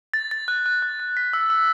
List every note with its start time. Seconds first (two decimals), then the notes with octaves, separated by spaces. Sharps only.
0.14 A6
0.31 A6
0.48 F#6
0.66 F#6
0.82 F#6
1.00 A6
1.17 B6
1.33 E6
1.50 E6